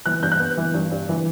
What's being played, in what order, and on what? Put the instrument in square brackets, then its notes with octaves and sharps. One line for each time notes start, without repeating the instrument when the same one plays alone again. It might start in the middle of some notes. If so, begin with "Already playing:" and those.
[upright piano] E3 F#6
G2 G6
F#6
B3
E3
G2
G2
E3